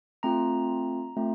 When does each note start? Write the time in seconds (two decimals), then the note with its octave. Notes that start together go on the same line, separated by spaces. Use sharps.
0.23 A3 C4 F4 A#5
1.17 A3 C4 F4